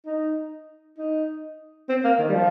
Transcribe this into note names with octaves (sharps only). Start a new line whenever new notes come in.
D#4
D#4
C4
A#3
D#3
G3
F3